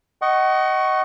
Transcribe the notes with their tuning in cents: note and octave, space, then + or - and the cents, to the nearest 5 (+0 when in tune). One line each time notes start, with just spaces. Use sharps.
D#5 +0 F#5 +30 C#6 +0